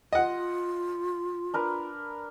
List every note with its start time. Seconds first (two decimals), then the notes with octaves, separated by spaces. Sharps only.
0.13 F4 D#5 F#5
1.54 D4 A#4 B4